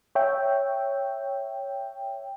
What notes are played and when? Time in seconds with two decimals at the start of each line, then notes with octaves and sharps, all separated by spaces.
0.15 C#5 E5 G5